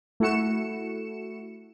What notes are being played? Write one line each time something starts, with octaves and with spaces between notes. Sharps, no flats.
A3 E4 F#4 C#7 E7